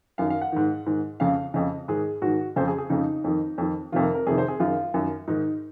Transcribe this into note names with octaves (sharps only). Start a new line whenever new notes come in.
F#2 D#3 F5
F5
F#5
G#2 D#3
G#2 D#3
F2 C#3 F5
F2 C#3 D#5
G#2 D#3 G#4
G#2 D#3 F#4
F2 C#3 C5
G#4
G#4
F2 C#3 D#4
F2 D#3
F2 D#3
F2 C3 D#3 F4
A#4
A#4
F2 C3 D#3 G#4
C5
G#4
F#2 D#3 F4
F#2 D#3
G#2 D#3 D#4